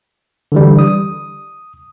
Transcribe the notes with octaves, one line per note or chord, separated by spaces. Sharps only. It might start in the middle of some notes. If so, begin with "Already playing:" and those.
D3 E3 G3
D#6